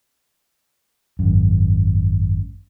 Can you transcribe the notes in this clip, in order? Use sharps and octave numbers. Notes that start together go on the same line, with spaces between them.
G#1 F#2